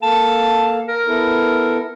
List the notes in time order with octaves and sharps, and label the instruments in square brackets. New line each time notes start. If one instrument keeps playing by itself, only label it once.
[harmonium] A#3 A4 F5 [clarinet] A5
[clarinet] A#4
[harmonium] B3 E4 A4